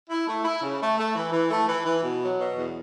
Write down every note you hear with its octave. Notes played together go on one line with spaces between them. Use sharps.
E4
A3
E4
C#3
A3
A3
E3
E3
A3
E3
E3
B2
F#3
B2
E2